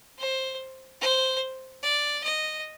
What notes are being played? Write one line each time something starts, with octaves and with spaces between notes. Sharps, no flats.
C5
C5
D5
D#5